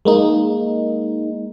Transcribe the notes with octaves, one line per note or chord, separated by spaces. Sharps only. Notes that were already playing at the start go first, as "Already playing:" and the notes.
G#3 A#3 D#4